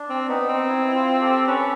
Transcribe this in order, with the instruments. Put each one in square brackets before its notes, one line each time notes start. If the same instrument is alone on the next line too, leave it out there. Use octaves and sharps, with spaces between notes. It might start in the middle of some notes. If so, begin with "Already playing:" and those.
Already playing: [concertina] D4
[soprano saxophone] C4
[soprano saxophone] B3 [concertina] D#4
[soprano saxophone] C4
[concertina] E4
E4
F4
G4 A4
[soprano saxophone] C#4 [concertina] A4 B4